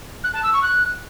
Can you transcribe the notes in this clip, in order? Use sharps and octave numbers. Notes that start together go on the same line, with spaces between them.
F#6
A5
E6
C#6
F#6